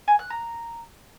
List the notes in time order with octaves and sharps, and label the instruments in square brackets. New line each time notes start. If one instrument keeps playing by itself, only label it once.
[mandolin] G#5
F#6
A#5